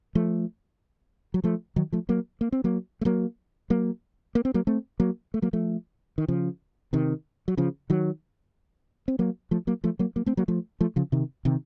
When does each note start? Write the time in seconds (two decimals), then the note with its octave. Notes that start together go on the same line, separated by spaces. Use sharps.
0.15 F3 A3
1.34 F#3
1.44 F3 A3
1.76 D#3 F#3
1.92 F3 A3
2.09 F#3 A#3
2.41 A#3
2.52 C4
2.64 F#3 A#3
3.01 A3
3.05 F#3 A#3
3.70 F#3 A#3
4.35 A#3
4.45 C4
4.54 F#3 A#3
4.67 A3 C4
5.00 F#3 A#3
5.34 A3
5.42 F#3 A#3
5.53 F3 A3
6.18 D#3
6.28 C#3 F3
6.93 C3 D#3
7.48 F#3
7.57 C#3 F3
7.90 D#3 F#3
9.08 C4
9.19 F#3 A#3
9.51 F3 A3
9.67 F#3 A#3
9.84 F3 A3
9.99 F#3 A#3
10.16 F#3 A#3
10.26 A3 C4
10.37 F#3 A#3
10.48 F3 A3
10.81 F3 A3
10.96 C#3 F3
11.12 C3 D#3
11.45 C3 D#3